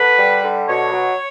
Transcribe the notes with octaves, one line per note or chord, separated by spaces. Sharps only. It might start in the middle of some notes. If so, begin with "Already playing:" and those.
Already playing: D3 B4
G3
D3
B2 C#5
F#3